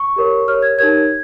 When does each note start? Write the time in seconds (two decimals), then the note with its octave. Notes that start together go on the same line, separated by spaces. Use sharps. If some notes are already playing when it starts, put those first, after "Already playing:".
Already playing: C#6
0.16 G4 A#4 C#5
0.48 G4 A#4 C#5 F6
0.62 G#6
0.78 D#4 G4 A#4 C#5 G#6